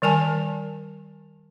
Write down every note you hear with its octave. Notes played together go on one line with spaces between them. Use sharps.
D#3 G3 A#4 G#5 A5